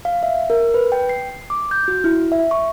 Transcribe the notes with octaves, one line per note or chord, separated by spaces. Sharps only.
F5
E5
A#4
B4
G5
C7
D6
G6
F#4
E4
E5
C#6